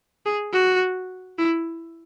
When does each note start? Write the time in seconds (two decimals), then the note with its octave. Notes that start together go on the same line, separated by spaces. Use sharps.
0.26 G#4
0.53 F#4
1.38 E4